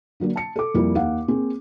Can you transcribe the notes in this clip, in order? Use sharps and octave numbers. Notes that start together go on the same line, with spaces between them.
D3 F#3 A#3 D4
A5 C#7
A4 D6
F2 G3 A#3 E4
D#2 F5 F#5
A#3 C4 G#4